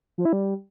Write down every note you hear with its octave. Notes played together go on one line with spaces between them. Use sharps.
F3
E4
G3